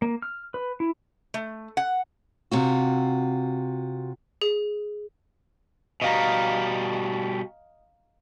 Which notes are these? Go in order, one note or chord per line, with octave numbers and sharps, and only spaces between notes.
A#3
F6
B4
E4
A3
F#5
C3 F4 F#4
G#4
B2 G3 D#5 F5 A#5